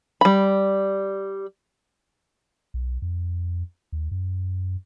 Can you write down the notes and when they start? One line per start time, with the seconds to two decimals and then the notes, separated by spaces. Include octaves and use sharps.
0.21 G3 B5
2.74 B1
3.02 F2
3.92 D#2
4.11 F#2